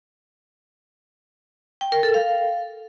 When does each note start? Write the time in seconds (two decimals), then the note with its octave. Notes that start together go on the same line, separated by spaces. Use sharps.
1.81 G5
1.92 A#4
2.03 A4
2.14 F5